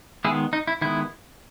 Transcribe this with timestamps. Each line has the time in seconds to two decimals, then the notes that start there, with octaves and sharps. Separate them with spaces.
0.24 D#3 G#3 B3 E4 G#4
0.53 D#4
0.67 E4
0.81 D#3 G#3 B3 E4